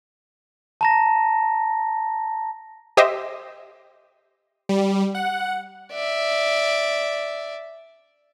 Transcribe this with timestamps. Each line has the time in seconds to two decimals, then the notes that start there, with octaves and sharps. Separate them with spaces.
0.81 A5 A#5 A#6
2.97 G4 C5 D#5 E5
4.69 G3
5.15 F#5
5.92 D5 E5